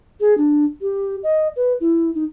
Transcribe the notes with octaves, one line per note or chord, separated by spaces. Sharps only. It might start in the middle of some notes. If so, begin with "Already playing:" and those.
G#4
D4
G4
D#5
B4
E4
D#4